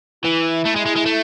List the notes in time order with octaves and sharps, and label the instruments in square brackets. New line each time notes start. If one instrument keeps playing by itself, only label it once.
[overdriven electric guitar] E3 [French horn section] E4
[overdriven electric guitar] A3
G#3
G#3
G#3
A3